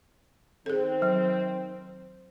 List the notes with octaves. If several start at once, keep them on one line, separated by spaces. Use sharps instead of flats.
D#3 C4 G#4 A4
F#3